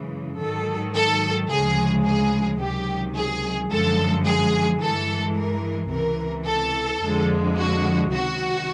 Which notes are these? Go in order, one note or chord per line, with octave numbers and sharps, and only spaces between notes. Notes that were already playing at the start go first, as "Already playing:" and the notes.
Already playing: F#2 C#3 E3 G#3
G#2 D#3 F#3 A4
A4
D2 C#3 F3 G#3 G#4
G#4
C#2 C3 D#3 F#3 G4
G#4
F#2 D3 F3 G#3 A4
G#4
G2 E3 G#3 A4
A#4
C#2 C3 E3 A#4
A4
F2 D3 F3 G#3
F#4
C#2 C3 D#3 F#3 F#4